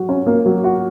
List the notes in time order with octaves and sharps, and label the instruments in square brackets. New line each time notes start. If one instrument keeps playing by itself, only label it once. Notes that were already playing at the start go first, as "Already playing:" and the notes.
Already playing: [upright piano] F#3 F#4
C#4
A#3
F#3
F#4